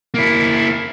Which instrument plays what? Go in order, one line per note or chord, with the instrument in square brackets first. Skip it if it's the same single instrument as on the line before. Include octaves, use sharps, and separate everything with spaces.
[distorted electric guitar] A#3 E4